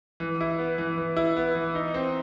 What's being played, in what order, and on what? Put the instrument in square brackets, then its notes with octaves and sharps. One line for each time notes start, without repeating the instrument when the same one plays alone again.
[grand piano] E3
E4
B3
E3
E3
E4
B3
E3
D#4
C4